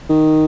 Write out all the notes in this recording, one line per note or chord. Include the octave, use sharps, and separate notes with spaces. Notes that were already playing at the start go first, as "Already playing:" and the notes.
D#3